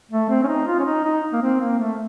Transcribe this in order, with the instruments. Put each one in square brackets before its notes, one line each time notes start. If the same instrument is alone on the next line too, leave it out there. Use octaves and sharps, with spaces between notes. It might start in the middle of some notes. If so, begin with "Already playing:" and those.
[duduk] A3
C4
C#4
D#4
F4
C#4
D#4
D#4
A#3
C4
A#3
A3